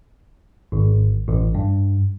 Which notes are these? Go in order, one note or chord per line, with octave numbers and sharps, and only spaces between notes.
G#1
A1
G2